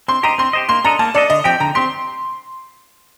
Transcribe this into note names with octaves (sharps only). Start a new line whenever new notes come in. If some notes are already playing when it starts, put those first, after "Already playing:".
C4 C6
G4 C5 D#5 A#5
C4 C6
G4 C5 D#5
A#3 C6
D4 A4 D#5 A#5
A#3 A5
D4 A4 D5 D#5
D3 D#5
F3 C4 G4 G5
D3 A#5
C4 G4 C6